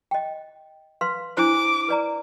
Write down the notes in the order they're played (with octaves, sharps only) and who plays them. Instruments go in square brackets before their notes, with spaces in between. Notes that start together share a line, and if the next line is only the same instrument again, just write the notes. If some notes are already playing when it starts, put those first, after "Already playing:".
[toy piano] D#5 G5
B4 F5 C6
[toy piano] D4 E4 C5 [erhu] D6
[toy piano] B4 D5 A#5